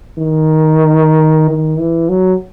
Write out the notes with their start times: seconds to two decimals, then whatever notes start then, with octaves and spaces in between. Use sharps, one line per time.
0.18 D#3
1.50 D#3
1.79 E3
2.09 F#3